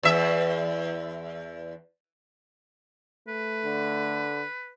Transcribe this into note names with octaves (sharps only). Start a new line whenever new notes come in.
E2 E5
A3 B4
D3